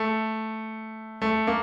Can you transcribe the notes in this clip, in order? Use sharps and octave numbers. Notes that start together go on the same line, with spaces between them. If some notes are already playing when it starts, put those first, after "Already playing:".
Already playing: A3
A3
A#3